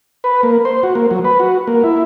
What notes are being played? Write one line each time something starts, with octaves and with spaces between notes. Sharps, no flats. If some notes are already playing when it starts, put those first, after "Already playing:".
B4
A#3
C5
F#4
A#3
F#3
B4
F#4
A#3
E4